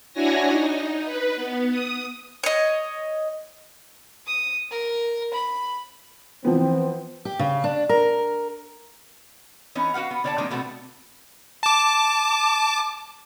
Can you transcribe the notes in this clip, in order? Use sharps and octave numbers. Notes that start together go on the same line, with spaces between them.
D4 E4 F#4 C#5 G#5 A#6
D#4
B4
B3
D#6
C#5 D#5
D#6
A#4
B5
E3 F3 B3 C4
G4
C#3
D4
A#4
E3 B3 C#4 D#4
F#4 B4 F5 F#5
B3
D3 C#5 D5 F#5 A5
F3 G#3 A#3 C4 D4 D#4
B2 A3 B3 C4 F#4
A5 D6